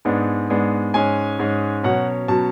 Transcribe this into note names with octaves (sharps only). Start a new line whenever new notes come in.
G#2 G#3 B3 D4
G#2 G#3 B3 D4
G#2 G#3 C#4 G#5
G#2 G#3 C#4
B2 F#3 C#4 F#5
B2 F#3 C#4 A5